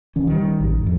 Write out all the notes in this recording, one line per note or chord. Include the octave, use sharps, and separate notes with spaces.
D1 D#3 C#4
D#3 G3
A1 F#2
F2 G#2